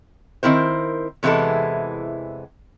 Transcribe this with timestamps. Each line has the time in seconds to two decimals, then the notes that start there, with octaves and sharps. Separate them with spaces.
0.43 D#3 C4 E4 A#4 C5
1.23 E2 C3 E3 G#3 E4 A4